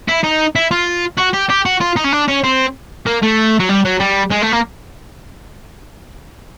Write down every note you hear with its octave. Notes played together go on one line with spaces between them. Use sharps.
E4
D#4
E4
F4
F#4
G4
G4
F#4
F4
D#4
C#4
D4
C#4
C4
A#3
A3
F#3
G3
F#3
G3
G#3
A3
A#3